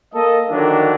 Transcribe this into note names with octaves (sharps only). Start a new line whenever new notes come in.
A#3 A4 D#5
D3 D#3 F3 F#3 A#3 D4